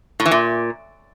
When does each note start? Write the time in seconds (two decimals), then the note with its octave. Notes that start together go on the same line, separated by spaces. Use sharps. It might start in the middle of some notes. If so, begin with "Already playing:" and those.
0.20 A2
0.26 E3
0.31 A#2